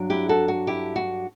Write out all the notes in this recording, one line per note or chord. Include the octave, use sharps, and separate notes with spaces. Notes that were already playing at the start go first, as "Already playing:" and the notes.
Already playing: G2 F#3 D4
E4 G4
F#4 A4
F#4
E4 G4
F#4